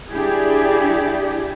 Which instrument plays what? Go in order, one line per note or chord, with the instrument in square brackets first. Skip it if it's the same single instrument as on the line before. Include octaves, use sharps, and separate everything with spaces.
[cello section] D4 E4 G4 G#4